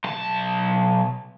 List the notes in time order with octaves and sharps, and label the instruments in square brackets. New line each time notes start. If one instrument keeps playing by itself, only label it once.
[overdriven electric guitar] B1 A5